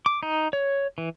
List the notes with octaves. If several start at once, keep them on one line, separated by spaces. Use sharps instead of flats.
D6
D#4
C#5
E3